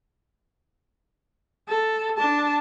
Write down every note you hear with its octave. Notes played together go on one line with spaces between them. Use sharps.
A4
D4 A5